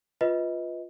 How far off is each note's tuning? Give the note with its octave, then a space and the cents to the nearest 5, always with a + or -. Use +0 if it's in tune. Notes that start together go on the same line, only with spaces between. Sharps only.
F4 +5 B4 +0 D#5 +25